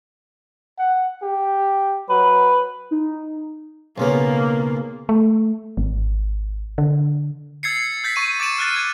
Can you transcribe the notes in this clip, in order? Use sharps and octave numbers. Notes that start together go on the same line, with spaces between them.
F#5
G4
F#3 B4
D#4
B1 C#3 A#3 B3
A3
G#1
D3
E6 G#6 A6 C7 C#7
E6 G6 A6 B6
C#6 D#7
D6 A6 D7 E7
F6 F#6 A6
G#6